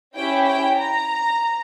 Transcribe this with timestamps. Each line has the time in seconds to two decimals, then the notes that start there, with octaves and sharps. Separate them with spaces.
0.16 C#4 E4 G4 G5
0.46 G5
0.76 A#5